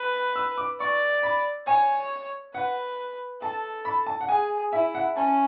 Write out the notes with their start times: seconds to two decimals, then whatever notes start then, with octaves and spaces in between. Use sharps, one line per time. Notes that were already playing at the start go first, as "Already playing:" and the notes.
Already playing: B4
0.36 E6
0.57 D6
0.80 D5 C#6
1.23 B5
1.67 C#5 G#5
2.54 B4 F#5
3.42 A4 A5
3.85 B5
4.06 A5
4.21 F#5
4.29 G#4 G#5
4.72 E4 E5
4.94 F#5
5.16 C#4 A5